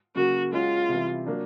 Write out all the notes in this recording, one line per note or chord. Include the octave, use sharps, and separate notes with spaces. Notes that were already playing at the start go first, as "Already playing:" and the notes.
C#3 F#3 A#3 F#4
G#3 C#4 F4 F#4
C3 E3 G3
F#3 A#3 D4